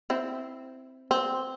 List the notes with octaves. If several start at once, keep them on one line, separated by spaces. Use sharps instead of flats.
C4 E4
C4